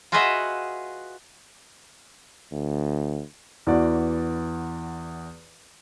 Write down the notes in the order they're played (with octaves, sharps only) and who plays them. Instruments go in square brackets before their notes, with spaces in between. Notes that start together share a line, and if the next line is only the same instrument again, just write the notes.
[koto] F4 F#4 G#4 B4 D#5 E5
[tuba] D2
[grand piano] E2 E3 F#4 D5